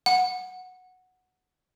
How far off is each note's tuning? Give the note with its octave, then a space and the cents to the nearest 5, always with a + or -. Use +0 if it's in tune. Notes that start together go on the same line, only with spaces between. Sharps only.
F#5 -5